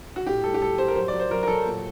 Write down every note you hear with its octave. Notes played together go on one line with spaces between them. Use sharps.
F#4
A2 G4
G3 A4
G4
G3 A4
G3 C5
A#4
F#3 C5
D5
F#3
C5
F#3 A#4
A#4
F#3 A4
A#2